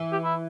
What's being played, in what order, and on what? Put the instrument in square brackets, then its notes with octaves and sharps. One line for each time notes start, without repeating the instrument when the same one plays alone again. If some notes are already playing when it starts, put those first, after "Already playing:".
Already playing: [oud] E3
[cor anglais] G4
E4